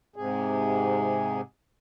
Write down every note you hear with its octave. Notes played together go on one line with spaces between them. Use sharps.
G#2 C3 G#4